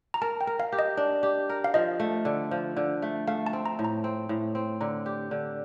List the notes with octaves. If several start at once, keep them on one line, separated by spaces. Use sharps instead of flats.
A#5
A#4 A5
G5
A#4
F5
G4
D#5
D4
G4
A#4
F5
F3 D#5
A3
D3
F3
D3
A3
A3 F5
A5
C4
A#5
A2
A#5
C4
A2
C4
D3 A#5
G4
D3